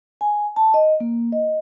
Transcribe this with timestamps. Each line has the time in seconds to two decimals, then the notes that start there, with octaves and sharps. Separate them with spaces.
0.21 G#5
0.56 A5
0.74 D#5
1.00 A#3
1.32 D#5